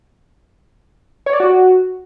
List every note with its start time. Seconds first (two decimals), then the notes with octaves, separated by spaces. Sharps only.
1.26 C#5
1.33 D5
1.40 F#4